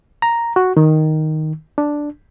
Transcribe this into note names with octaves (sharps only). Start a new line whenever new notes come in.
A#5
F#4
D#3
D4